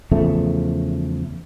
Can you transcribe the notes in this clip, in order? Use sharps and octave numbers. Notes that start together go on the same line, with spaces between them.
E2 C#3 F3 A3